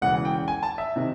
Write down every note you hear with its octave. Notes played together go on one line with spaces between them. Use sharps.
E1 E2 C#3 E3 F#5
G5
G#5
A5
E5
C3 D#3